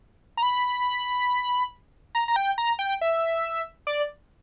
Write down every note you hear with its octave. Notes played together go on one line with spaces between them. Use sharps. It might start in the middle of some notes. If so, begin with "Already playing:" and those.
A#5
B5
A#5
A#5
G5
A#5
G5
E5
D5